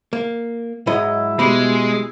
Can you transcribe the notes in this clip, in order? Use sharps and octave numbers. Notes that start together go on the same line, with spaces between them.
A#3
G#2 F#3 E4 D#5
B2 G#3 G4 B5